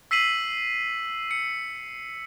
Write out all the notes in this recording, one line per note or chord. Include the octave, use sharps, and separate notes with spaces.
E6 B6 C7 D#7 F#7
C#7